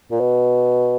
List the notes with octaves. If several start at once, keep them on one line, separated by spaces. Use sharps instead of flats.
A#2
B2